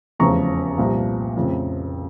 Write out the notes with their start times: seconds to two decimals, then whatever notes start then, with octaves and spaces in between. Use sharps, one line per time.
0.19 F1 E2 C#3 F3 A#5 C#6
0.78 C2 A#2 F3
1.36 F1 F2 C#3